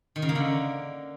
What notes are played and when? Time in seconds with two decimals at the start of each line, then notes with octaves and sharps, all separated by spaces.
0.16 D#3
0.22 C#3
0.29 A#3
0.35 D3